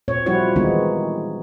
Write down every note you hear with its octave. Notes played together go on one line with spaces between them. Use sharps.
A#2 C4 C#5
F3 G3 C4 E4 F#4 C#5
D#3 E3 G#3 B3 C4 D#4